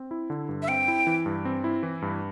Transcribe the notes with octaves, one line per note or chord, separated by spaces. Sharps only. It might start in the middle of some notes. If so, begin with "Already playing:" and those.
Already playing: C4
E4
D3
G2
E5
C4 G5
E4
E3
G2
C4
E4
E3
G2